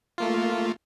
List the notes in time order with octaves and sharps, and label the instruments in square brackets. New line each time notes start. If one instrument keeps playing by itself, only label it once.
[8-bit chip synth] A3 A#3 F4